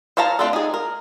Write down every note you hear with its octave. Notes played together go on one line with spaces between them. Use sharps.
C5 C#5 F5 A5 A#5
A3 C4 D4 F4 A4
D#4 G#4
A#4